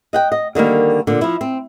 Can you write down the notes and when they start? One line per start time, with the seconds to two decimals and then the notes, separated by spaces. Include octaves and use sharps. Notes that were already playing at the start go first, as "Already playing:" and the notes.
0.13 D#5 F#5 G5
0.32 D#5
0.55 D3 D#3 G3 A#3
1.07 A#2 D3
1.21 F3 E4
1.41 C4